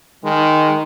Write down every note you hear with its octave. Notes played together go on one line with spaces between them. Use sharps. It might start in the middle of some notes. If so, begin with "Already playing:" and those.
D#3 G#3